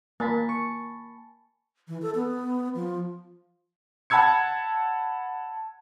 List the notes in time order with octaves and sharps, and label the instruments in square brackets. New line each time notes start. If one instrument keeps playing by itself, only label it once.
[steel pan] A#3 [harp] G#5 A5 B5
[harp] C#6
[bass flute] E3
A4
B3
F3
[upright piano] F#5 A5 B5 E6 G#6 C#7